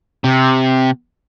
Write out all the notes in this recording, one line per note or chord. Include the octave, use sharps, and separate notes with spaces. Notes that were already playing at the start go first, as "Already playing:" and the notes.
C3